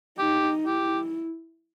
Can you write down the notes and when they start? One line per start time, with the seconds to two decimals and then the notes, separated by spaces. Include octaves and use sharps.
0.19 D#4 G4
0.66 E4 G4